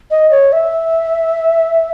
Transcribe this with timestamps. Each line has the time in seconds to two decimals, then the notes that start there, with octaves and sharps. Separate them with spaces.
0.11 D#5
0.31 C#5
0.52 E5